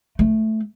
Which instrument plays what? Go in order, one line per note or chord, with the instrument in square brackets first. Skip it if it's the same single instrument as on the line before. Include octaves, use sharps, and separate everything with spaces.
[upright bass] A3